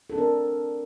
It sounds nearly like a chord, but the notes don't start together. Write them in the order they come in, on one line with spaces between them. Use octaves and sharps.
A4 D4 C4 A#4